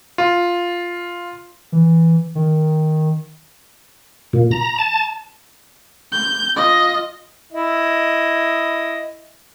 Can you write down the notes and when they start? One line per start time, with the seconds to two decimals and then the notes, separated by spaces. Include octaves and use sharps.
0.18 F4
1.72 E3
2.35 D#3
4.33 A#2
4.51 A#5
4.79 A5
6.12 G6
6.56 F4 D#5
7.53 E4 D#5